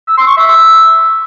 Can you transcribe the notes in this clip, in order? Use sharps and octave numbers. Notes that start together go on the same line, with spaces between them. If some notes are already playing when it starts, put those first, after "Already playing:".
E6
C6
C#6
E5